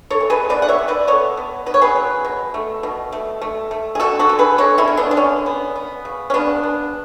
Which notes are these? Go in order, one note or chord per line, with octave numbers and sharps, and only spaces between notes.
A4 C#5
E3
G#4 B4
B3 B4 D5
F#5
C#5 E5
E3
B4 D5
B3 A4 C#5
B3
B3 B4
C#5
G#4 B4
F#3
B2
A3
B2
A3
A3
A3
G#4
D3 F#4 A4
F#4 A4
D3
G#4 B4
G#3 A4 C#5
C#4 E4
D3
B3 D4
D4
D3 C#4
B3
B3
C#3
C#4
C#3 B3 D4
B3